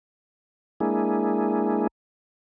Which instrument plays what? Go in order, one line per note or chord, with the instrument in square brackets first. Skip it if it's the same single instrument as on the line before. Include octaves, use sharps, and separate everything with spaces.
[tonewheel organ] G#3 A#3 D4 E4 G#4